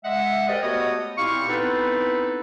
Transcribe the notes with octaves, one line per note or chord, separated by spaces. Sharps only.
G#3 D#5 E5 F#5
G4 G#4 A#4 C5 D5 D#5
A3 B3 F#4 G4 C#5 D#5
A#2 C4 E4 G4 F5 C#6
B3 C4 D#4 E4 A4 B4